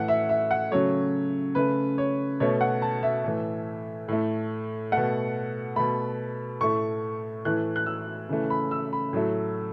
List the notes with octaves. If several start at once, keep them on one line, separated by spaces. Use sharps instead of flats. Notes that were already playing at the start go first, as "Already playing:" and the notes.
Already playing: A2 E3 A3 F#5
E5
E5
F#5
C#3 F#3 A3 C#5
C#3 A3 B4
C#5
B2 A3 C#5
F#5
A5
E5
A2 E3 A3
A2 A3
B2 A3 F#5
B2 A3 B5
A2 A3 C#6
A2 E3 A3 F#6
F#6
E6
C#3 E3 A3
B5
E6
B5
A2 F#3 A3